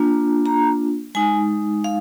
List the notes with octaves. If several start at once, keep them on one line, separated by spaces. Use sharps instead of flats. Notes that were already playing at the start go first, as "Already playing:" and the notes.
Already playing: A#3 D4 F4
A#5
G#3 D#4 G#5
F5